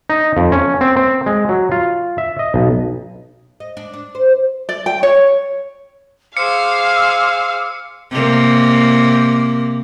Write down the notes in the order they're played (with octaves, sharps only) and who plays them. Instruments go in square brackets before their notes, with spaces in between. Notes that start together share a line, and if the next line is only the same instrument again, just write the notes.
[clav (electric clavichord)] D#4
F2
C#4
C4
C4
G#3
F#3
F4
E5
D#5
B1
[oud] D#5
D4
D4
C5
[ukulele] D5
G5
C#5
[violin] G#4 C5 [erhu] F5 [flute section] D6 E6 F6 [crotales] C#7
[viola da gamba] C3 A#3